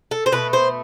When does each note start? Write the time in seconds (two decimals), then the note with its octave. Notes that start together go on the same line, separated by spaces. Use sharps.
0.11 A4
0.26 C5
0.32 B2 A3 B4
0.53 C5